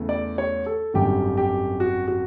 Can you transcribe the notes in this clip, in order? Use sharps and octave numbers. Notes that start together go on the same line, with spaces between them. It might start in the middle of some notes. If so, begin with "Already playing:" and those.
Already playing: E2 C#3 A3
D5
C#5
A4
G#1 F#2 D3 G3 G4
G4
F#4
F#4